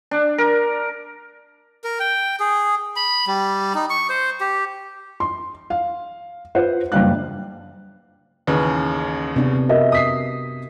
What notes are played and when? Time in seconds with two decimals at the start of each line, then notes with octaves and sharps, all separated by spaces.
0.11 D4
0.38 A#4
1.84 A#4
2.00 G5
2.40 G#4
2.96 B5
3.27 G3
3.75 D#4
3.90 C#6
4.10 C5
4.41 G4
5.20 C6
5.70 F5
6.55 F4 B4 C5 F#5
6.92 F#1 G2 G3 F5 F#6
8.47 A1 D#2 C#3 B4
9.36 C3 B3 D4
9.69 F#4 A#4 D#5 E5
9.92 D#6 B6 C7